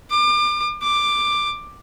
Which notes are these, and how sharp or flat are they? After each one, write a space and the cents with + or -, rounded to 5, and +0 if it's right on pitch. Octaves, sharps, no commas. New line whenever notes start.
D6 +35
D6 +10